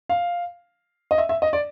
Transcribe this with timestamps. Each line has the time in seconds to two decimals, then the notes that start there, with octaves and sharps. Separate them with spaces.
0.09 F5
1.11 D#5
1.18 E5
1.29 E5
1.42 D#5
1.53 D5